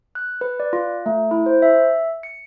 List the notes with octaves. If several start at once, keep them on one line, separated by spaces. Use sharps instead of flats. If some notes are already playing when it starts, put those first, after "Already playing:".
F#6
B4
D5
F4
A3
E4
C5
E5
C#7